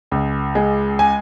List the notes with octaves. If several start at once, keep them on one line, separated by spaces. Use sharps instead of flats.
C#2
G#3
G#5